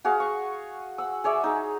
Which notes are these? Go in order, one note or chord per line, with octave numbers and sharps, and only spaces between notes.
F#4 G#4 F5
C#6
F#5 E6
G#4 C#5 D5 E5
D#4 G#4